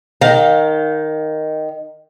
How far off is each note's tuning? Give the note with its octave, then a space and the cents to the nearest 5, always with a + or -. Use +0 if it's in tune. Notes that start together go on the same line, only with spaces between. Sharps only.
D#3 +0 F5 +20 A#5 +0